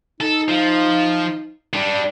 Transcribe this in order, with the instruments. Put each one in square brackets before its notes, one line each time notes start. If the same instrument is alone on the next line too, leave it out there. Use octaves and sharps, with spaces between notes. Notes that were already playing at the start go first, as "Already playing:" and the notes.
[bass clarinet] D#4 [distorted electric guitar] A4
[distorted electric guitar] F3
G3 D4